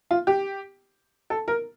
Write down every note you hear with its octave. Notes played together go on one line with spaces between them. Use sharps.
F4
G4
A4
A#4